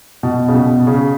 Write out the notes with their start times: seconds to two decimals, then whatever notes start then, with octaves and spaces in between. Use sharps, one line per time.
0.23 B2
0.48 C#3
0.54 B2
0.87 C#3